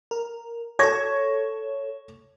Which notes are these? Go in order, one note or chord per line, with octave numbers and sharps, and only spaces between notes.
A#4
A4 C#5 C#6 G#6 A#6